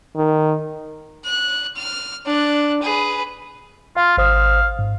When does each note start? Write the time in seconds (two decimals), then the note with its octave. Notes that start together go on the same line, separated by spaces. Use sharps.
0.16 D#3
1.25 F#6
1.76 F6
2.26 D4 F#6
2.82 G#4 B4
3.97 F4 F5
4.18 G#1 C5 F5 D#6
4.79 G#2